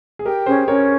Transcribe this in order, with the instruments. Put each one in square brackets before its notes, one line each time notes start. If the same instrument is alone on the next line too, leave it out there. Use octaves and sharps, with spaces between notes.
[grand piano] G#4
[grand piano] G4 A#4 [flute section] G5
[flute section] C#4 [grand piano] G#4 C5
[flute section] C#4 [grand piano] A#4 C#5